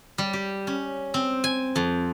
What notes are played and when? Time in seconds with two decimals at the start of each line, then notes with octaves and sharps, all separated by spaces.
0.18 G3
0.33 G4
0.67 C#4
1.14 C4
1.44 G#5
1.76 F2